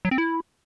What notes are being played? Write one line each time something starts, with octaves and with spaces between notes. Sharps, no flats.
F#3
C4
E4